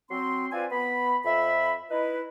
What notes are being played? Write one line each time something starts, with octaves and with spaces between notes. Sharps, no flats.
F#3 C4 C6
C4 F4 B4 D5 G#5
B3 B5
F2 E5 B5
D#4 E4 B4